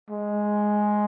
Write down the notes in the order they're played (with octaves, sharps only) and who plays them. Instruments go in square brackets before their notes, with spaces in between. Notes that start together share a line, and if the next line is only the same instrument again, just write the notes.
[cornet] G#3